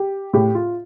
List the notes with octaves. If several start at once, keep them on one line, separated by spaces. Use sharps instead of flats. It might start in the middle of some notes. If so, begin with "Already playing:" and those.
Already playing: G4
A2 G4
F4